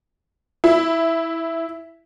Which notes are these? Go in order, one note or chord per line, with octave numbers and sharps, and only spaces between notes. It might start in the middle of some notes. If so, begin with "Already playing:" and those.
E4